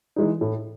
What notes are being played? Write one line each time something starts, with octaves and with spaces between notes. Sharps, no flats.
E3 G#3 D#4
A2